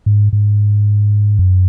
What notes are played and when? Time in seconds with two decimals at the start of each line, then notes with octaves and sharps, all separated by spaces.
0.06 G#2
0.33 G#2
1.39 F#2